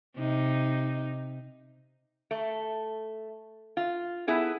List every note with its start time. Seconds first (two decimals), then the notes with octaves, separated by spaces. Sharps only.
0.17 C3 D#4
2.31 A3
3.77 F4
4.27 B3 E4 G#4 A4